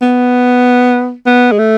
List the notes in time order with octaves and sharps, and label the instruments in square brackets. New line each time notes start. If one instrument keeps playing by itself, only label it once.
[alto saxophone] B3
B3
G#3
A3